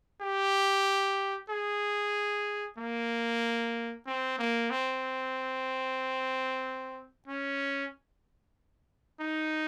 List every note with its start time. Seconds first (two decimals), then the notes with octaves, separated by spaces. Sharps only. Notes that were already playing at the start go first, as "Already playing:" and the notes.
0.22 G4
1.50 G#4
2.78 A#3
4.06 C4
4.39 A#3
4.71 C4
7.28 C#4
9.20 D#4